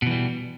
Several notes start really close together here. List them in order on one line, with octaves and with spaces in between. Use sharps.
B2 E3 G3